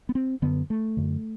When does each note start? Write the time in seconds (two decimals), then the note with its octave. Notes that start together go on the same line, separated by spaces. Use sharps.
0.09 B3
0.15 C4
0.42 F#2 D3 B3
0.70 A3
0.97 F#2 D3